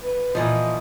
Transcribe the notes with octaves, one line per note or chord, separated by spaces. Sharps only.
B4
A#2 E3 F3 D#5